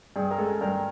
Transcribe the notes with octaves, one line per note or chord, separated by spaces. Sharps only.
G2 G#4
A#4
G#3 A4
G2 A#4